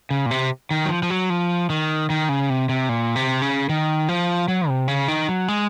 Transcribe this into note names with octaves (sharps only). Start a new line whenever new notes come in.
C#3
A#2
C3
D#3
F#3
F3
F3
F#3
F3
D#3
D#3
C#3
C3
C3
A#2
C3
C#3
D#3
F3
F#3
C3
C#3
D#3
F#3
G#3